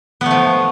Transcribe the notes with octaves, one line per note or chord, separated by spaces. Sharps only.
F3 A3 B3